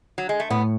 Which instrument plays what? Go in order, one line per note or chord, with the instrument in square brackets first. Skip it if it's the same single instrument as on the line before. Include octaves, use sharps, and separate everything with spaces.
[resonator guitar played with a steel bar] F#3
G#3
A3
[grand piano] A2 [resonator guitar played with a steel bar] B3